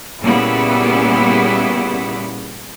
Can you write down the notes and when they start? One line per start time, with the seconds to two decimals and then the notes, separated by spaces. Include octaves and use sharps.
0.21 A#2 C#3 G3 B3 E4